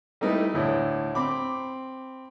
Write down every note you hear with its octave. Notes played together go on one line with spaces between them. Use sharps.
G3 A3 D#4 E4 B4
D2 A2 D4
C4 B5 D6